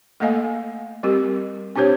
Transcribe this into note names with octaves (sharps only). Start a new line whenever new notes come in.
A3 A#3 A4 D#5 F5 G#5
G3 C4 G4 A#4
C4 D4 G4 C5 C#5